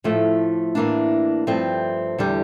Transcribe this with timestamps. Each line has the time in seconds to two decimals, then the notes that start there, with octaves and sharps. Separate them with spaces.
0.04 A2 F3 A3
0.75 A2 E3 A#3 D4
1.47 G2 F3 A3 C4
2.18 E2 D3 G3